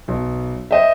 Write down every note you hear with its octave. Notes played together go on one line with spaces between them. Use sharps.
B1
C5 D#5 E5